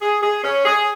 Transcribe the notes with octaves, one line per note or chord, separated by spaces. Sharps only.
G#4
G#4
C#4
G#4